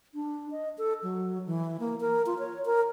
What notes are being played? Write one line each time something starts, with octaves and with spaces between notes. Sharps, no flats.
D4
D#5
A4
F#3
E3
A#3
A#4
F4
C#5
A#4